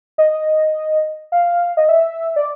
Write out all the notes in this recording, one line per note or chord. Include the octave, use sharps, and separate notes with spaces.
D#5
F5
D#5
E5
D5